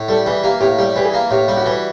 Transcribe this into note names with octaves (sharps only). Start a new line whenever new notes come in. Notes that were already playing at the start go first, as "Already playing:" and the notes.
Already playing: A2
G3 A4
E3 G#4
A#3 G4
A2 G4
G3 G4
E3 G4
G#4
A#3
A2 G4
G3
F#4
E3